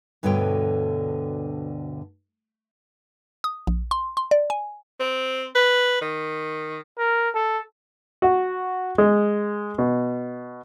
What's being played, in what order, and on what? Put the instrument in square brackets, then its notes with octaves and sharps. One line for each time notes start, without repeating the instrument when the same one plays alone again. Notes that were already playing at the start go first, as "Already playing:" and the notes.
[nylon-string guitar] D2 G2 B2 D3 C#5 G5
[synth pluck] D#6
A#1
C6
C6
D5
G#5
[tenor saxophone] C4
B4
D#3
[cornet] A#4
A4
[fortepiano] F#4
G#3
B2